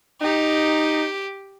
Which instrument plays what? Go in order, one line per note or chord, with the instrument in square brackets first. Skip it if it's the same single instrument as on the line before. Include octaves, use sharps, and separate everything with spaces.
[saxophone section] D#4 [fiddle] G4